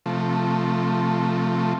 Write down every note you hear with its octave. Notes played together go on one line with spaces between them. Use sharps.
C3 F3 A3